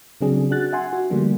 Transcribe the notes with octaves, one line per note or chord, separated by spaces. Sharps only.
C#3 F#3 C4 D4 G#4
D4 F#4 F#6 A6
E5 F#5 G#5 C6
F#4
D3 F3 G3 A3 A#3 D4